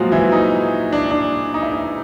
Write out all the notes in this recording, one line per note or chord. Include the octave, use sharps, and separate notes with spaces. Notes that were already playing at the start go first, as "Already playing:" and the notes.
Already playing: A#2 F3 F#3 G#3 F4 F#4
E3 E4
D#4
D4
D4
D#4
E4
D#4